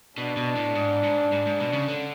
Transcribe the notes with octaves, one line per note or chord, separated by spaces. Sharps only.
B2 D4
B2
A2
G#2
G#2
G#2
G#2
B2
C#3
D3